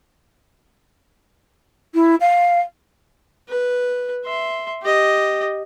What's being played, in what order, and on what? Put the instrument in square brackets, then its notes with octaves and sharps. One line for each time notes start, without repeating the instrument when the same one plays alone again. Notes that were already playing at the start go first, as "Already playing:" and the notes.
[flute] E4
F5
[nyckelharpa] B4
E5 C6
G4 D#5